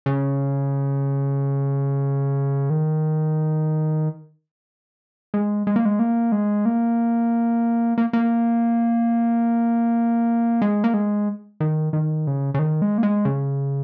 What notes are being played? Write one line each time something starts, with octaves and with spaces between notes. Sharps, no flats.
C#3
D#3
G#3
G#3
A#3
G#3
A#3
G#3
A#3
A#3
A#3
G#3
A#3
G#3
D#3
D#3
C#3
C#3
D#3
G#3
A#3
G#3
C#3